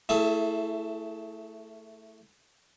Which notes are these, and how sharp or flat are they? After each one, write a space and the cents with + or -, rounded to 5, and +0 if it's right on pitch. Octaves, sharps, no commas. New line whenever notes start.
A3 +15 E4 +0 G#4 +40